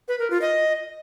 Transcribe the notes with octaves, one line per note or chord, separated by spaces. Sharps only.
B4
A#4
F4
D#5